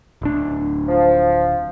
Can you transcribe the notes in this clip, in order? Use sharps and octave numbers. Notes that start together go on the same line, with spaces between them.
D1 D4
F3